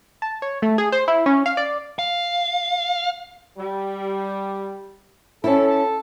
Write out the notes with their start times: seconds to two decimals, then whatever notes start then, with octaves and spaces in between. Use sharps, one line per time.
0.22 A5
0.42 C#5
0.62 A3
0.78 G#4
0.92 C5
1.08 E4
1.26 C#4
1.46 F5
1.57 D5
1.99 F5
3.57 G3
5.44 C#4 E4 A4